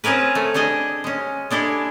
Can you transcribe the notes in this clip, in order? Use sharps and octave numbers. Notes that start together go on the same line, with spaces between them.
C4 C#4 G#4 A#4 B4
A3
G3 D4 G#4 D#5
G#3 C#4
G#3 D4 E4 G4 A4